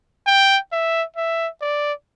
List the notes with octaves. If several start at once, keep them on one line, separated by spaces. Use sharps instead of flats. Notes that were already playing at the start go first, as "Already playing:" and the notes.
G5
E5
E5
D5